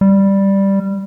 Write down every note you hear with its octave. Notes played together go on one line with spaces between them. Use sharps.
G3